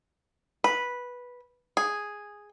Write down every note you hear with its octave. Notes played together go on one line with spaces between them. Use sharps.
B4
G#4